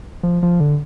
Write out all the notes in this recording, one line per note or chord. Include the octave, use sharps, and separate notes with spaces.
F3
F3
D3